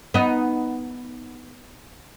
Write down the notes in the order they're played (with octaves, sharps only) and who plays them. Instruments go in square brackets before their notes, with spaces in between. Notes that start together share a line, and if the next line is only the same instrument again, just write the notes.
[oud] B3 D#4